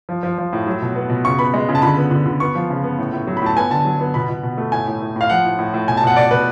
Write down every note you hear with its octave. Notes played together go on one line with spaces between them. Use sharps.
F3
F3
F3
A2
F#3
B2
B3
B2
C#3 C#6
B3 B5
G#3
C#3
A5
D3 B5
B3
D3
D3
B3 C#6
F3
C#3
B3
A2
A2
F#3
B5
A2 A5
B3 G#5
D3 A5
F#3
B3
B2 B5
B2
B2
A3
A2 G#5
A2
A2
A2 F5
F3 F#5
A2
A2
A2
B2 G#5
A5
B2 F#5
B2 D5
B2 B4